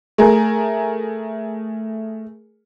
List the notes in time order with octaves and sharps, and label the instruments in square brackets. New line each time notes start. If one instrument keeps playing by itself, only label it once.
[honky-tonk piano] A3 G#4 A#4